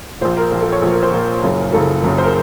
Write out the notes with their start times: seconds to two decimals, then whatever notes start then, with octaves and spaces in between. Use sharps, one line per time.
0.21 A#1 A#2 C5
0.37 A#4
0.51 A#1 A#2 A#4
0.61 A4
0.72 C#5
0.82 A#1 A#4
0.86 A#2
0.92 A#4
1.03 C5
1.12 A#1 A#2 A#4
1.42 F#1 F#2 C#3
1.72 F#1 F#2 C#3 A4
2.03 F#1 F#2 C#3
2.18 C5
2.23 A#4